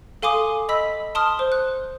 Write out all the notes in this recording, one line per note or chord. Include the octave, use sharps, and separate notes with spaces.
A4 F5 G#5 C6 D6 D#6
D#5 B5 E6 B6
A5 C6 D#6 F6
C5
F#6